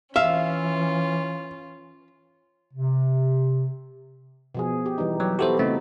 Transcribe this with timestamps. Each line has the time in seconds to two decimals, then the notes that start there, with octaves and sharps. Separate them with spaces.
0.16 E3 C#4 F4 E5 F5
2.74 C3
4.55 B2 F3 G#4
4.86 G4
4.98 E3 G3 D#4
5.20 F#3 G4
5.39 B3 E4 F#4 G4 A4 C5
5.59 C#3 A3 C4 D#4